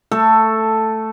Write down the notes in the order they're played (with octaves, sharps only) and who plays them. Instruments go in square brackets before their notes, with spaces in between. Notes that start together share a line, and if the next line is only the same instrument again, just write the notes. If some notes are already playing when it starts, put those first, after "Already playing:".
[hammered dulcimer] A3 A4